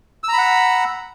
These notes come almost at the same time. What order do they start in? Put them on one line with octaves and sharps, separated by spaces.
E6 A#5 B5 F#5